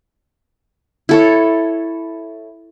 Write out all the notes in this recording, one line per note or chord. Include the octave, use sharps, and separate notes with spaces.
E4 A4 C#5